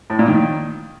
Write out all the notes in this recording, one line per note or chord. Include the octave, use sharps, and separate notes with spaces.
A2
A#2
D#3